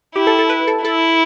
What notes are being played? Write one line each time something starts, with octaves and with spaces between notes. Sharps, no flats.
E4 G4
A4
A4
B4
A4
E4 A4